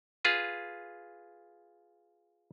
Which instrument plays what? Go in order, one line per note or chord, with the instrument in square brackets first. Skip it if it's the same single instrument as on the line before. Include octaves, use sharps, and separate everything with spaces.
[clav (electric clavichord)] F4 G#4 B4